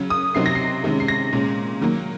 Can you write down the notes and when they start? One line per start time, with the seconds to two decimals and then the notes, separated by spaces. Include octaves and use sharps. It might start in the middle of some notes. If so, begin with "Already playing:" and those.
Already playing: C#3 F#3 C#4
0.10 D#6
0.35 C3 F#3 C4 D#4 C7
0.46 A#6
0.55 C7
0.84 C3 D#3 G#3 C#4
1.00 C7
1.08 A#6
1.32 A#2 G#3 C#4
1.81 D#3 F#3 A#3